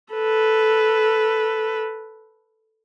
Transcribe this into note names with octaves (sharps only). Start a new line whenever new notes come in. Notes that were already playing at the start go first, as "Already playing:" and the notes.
A4 B4